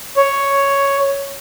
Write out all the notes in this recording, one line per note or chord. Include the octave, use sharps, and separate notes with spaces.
C#5